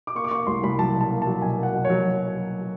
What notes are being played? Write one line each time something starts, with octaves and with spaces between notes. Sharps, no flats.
D6
A#3 C#6
D6
A#3 C#6
C2 C6
C2 B5
F#3 A5
B2
A5
A#3
F#3 A5
B2 G#5
A#3 F#5
B2
C#5
F#3